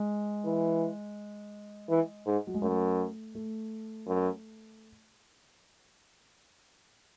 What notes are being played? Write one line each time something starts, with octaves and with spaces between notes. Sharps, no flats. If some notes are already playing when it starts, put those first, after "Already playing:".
Already playing: G#3
E3
E3
G#2
F#3
G#3
F#2 A3
A3
F#2